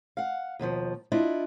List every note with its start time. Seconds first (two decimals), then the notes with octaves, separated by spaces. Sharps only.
0.17 F5 F#5
0.59 D#2 B2 D3 F3
1.12 D4 E4 F4 D5 D#5